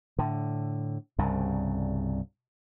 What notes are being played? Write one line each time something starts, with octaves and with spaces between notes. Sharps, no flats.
A2 D3
C2 G2 C#3